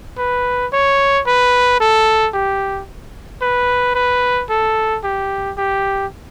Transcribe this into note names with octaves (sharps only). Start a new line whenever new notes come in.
B4
C#5
B4
A4
G4
B4
B4
A4
G4
G4